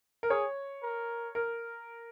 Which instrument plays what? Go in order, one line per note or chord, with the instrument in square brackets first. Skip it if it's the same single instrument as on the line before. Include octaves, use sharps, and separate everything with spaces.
[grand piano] A#4
[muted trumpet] G#4 [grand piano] C#5
[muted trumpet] A#4
[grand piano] A#4